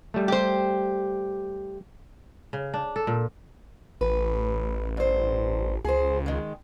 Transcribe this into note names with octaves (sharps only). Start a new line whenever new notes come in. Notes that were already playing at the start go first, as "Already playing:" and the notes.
G3 A3
G4 C5
C#3
D4
A4
A#2
A1 B4
G2 C5
C#2 G#4 C5
D#3 G#3